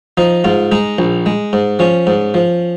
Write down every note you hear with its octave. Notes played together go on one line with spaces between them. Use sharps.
F3 D#4
G#2 F4
G#3 D#4
A#1
G#3
G#2
F3 C#4
G#2
F3